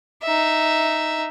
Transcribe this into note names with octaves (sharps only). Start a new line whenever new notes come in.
D#4 E5